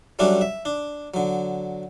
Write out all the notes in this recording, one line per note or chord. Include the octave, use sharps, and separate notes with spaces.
F#3 G3 A3 C#4 D4 F#4
E5
D4
D3 F#3